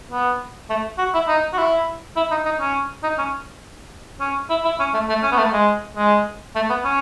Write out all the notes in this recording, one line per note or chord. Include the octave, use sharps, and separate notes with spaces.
B3
A3
F#4
E4
D#4
F#4
E4
E4
D#4
D#4
C#4
D#4
C#4
C#4
E4
E4
C#4
A3
A3
C#4
B3
A3
G#3
G#3
A3
B3
C#4